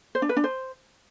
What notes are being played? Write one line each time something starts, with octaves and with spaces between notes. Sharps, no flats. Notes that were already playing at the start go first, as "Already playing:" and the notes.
C5
D4
B4
D4
C5